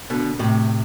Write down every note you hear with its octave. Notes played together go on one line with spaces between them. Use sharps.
B2 D3
A2 C3